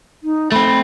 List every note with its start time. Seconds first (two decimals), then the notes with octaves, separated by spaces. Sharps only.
0.23 D#4
0.52 A3 C4 B5